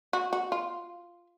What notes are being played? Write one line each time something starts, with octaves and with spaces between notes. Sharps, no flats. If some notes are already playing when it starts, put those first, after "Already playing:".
F#4
F#4
F4